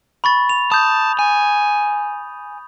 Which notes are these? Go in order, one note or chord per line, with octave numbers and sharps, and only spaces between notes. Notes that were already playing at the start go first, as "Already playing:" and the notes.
B5 C#6 A6
F7
A5 D#6 G6
G#5